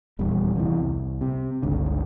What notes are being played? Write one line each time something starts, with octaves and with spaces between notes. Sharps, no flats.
D#1 E2 G3
E2 C3 E3
C2
C3
G1 C#2 D3